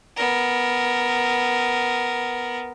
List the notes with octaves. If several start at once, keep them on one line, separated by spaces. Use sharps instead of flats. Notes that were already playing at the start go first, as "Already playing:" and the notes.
B3 A#4